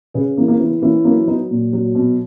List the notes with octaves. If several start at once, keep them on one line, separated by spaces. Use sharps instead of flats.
C#3 G#4 B4
E3 A#3
A#3
E3 B3
E3 A#3 C#4
F#3 A#3 C#4
F#3 B3 D#4
A#2
F#3
B2